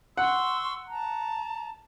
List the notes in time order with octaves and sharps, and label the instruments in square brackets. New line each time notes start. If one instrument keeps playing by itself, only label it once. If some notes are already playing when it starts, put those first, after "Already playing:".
[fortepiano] F#5 [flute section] C6 C#6 E6
[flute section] A5 A#5